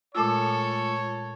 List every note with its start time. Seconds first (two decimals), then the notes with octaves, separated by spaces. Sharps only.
0.15 A#2 G#3 A3 F4 A4 C#5 D6 E6